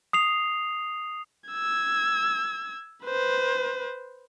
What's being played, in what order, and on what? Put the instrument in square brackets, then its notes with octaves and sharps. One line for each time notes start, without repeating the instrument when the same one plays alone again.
[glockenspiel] D#6 C7 F7
[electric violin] E6 G#6
B4 C5